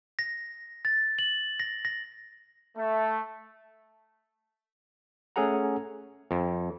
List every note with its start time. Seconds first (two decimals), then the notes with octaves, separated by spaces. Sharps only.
0.19 A#6
0.85 A6
1.19 F#7
1.60 A#6
1.85 A#6
2.77 A3
5.36 A3 C#4 G#4 A4 F#5 A#5
6.31 F2